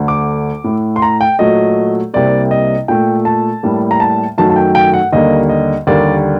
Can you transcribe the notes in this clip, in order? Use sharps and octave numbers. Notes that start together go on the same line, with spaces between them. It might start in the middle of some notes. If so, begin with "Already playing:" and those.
Already playing: D2 D3 A3
D6
A2 A3
C6
A#5
G5
A#2 F#3 A3 D#5
C2 C3 G3 A#3 D5
D#5
A#2 A3 G5
A5
A2 G3 A#3
A#5
A5
F#2 D#3 F#3 A3 A5
A5
G5
G5
F#5
D#2 D3 G3 A#3 D#5
D#5
D#2 D3 G3 A#3 D5